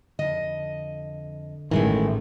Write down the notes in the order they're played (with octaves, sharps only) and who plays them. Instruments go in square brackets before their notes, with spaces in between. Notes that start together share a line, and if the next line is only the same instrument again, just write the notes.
[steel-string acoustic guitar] F2 D#5 [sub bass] D3
[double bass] A1 [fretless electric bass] D#3 [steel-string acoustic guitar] E3 G#3 A3